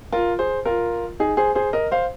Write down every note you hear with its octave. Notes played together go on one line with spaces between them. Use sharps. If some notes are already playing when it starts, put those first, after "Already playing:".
F4 A#4
G#4 C5
F4 A#4
D#4 G#4
G#4 C5
G#4 C5
A#4 D#5
C5 F5